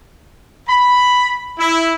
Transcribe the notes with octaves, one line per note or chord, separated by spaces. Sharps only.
B5
E4